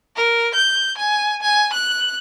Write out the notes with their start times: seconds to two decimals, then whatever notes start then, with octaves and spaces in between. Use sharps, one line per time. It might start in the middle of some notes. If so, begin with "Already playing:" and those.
0.16 A#4
0.54 G6
0.98 G#5
1.42 G#5
1.73 F#6